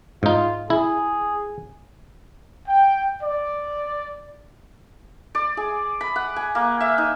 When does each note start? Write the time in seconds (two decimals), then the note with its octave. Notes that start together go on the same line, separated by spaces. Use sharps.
0.23 G#2 D#4 F4
0.70 E4 G#4
2.67 G5
3.22 D5
5.35 D5
5.57 G#4
6.01 B5
6.16 F#5
6.36 G#5
6.55 A#3
6.80 E5
6.98 D#4